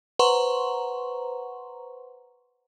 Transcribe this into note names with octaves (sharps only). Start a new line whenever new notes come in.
B4 C5 F#5 A#5 C6 C#6